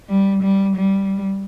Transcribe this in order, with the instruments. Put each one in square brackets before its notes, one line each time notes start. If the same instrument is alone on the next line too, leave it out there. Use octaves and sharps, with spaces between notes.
[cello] G3
G3
G3